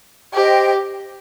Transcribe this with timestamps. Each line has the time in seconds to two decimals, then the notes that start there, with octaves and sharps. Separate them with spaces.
0.34 G4 C5 D#5 G5